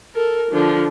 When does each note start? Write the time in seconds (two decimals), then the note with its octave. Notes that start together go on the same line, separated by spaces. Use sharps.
0.15 A4 A#4
0.51 D3 F3